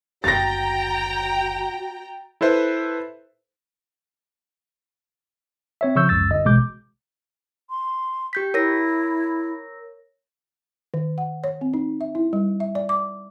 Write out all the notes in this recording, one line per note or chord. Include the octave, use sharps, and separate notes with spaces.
F#1 D2 F#4 G5 A#5 A6 A#6
E4 A4 B4 C5 E5
C4 C#5 E5
C#3 F3 C#6 E6 G6
G#1 C#2 F#2 E6 A6
G1 D#5
A1 B2 G#3 D6 G6
C6
G4 G6 B6
E4 A#4 C#5 A#6
D#3
F#5
C#5
C4
D#4
E5
E4
G3
E5
D5
D6